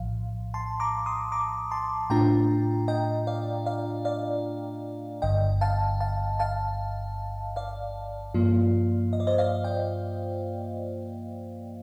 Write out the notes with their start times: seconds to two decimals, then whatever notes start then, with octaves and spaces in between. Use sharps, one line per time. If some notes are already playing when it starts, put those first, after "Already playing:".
Already playing: A#1 A2 F3 F5
0.54 A5 C6
0.80 A#5 D6
1.06 C6 D#6
1.32 A#5 D6
1.71 A5 C6
2.10 A2 A3 D4 F4 G5 A#5
2.88 D#5 G5
3.27 D5 F5
3.66 D5 F5
4.05 D5 F5
5.22 G1 G2 D3 D#5 G5
5.61 F5 A5
6.00 F5 A5
6.39 F5 A5
7.56 D5 F5
8.34 G2 F3 A#3 F4
9.13 D#5
9.20 D5
9.27 C5 D#5
9.38 D5 F5
9.64 D#5 G5